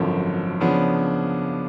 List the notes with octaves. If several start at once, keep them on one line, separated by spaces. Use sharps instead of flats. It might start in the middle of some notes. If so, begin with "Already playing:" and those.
Already playing: G#1 F#2 D3 F3
C#3 F3 B3 D4